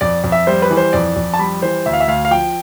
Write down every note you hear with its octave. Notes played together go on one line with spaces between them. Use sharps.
F2 D5
F2
E5
G3 C5
B4
E3
C5
F2 D5
F2
A5
G3 B5
E3 C5
D2 E5
F5
E5
D2 F5
F5
F3 G5